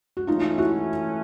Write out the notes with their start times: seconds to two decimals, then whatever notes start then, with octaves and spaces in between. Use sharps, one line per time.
0.17 F#4
0.27 E3 A3 C#4 D#4 F4
0.58 E4 F#4